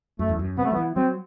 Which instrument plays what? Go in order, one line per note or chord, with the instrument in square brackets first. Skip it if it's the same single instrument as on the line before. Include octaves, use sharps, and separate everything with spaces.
[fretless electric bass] F#2 [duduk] A3
[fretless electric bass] E2
F#2
[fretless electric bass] C3 [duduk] B3
[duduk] A3
[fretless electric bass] F#3 [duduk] B3
[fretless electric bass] E3
[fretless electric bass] F#3 [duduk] C4